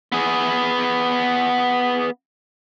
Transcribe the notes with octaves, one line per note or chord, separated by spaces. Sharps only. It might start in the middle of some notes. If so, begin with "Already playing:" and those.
B3 G#4